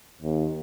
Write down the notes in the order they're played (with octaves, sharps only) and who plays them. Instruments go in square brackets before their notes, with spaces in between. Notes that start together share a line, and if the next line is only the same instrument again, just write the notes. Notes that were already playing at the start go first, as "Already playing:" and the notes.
[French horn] D#2